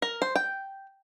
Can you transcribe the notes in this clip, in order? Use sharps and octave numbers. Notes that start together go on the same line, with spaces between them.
A#4
C5
G5